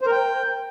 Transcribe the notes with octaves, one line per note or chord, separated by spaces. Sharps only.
C5
A#4
G5